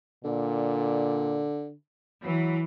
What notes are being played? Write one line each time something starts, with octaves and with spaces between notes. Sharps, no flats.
A#2 D3
E3 F#3